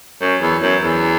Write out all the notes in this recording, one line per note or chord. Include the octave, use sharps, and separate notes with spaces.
F#2
E2
F#2
E2